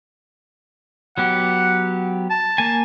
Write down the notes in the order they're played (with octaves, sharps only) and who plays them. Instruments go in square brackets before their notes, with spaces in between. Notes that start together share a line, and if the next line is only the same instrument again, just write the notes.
[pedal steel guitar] F#3 B3 G4 [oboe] F#5
[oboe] A5
[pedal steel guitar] A#3 G#5